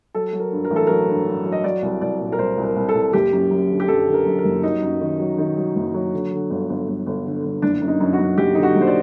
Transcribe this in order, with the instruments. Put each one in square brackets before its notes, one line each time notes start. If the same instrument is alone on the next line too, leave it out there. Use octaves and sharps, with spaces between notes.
[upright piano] F#3 A4
F#3
A#4
G2
A#4
A1
A4
F#3 A#4
G2
G2
F#3
D#5
F#3 D5
C2
C2 D5
A#2
A#4
C2 C5
C2
A#4
C2
A4
C2
F#1 G4
F#2
F#2
D3
G4
F#2 A4
D3
A#4
F#2
A#4
F#1
F#3 D#4
F#2
D#3
F#3
D#3
F#3
F#1
F#3
D3
D3
G1
G1
G1
G1
D3
G1
F#1 D4
F#2
D#4
F#2
F#4
F#2
F#1 G4
D3 D#4
F#4
F#1
C5
D5